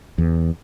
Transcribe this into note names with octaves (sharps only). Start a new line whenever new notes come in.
E2